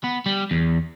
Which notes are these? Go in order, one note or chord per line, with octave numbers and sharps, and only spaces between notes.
B3
G3
E2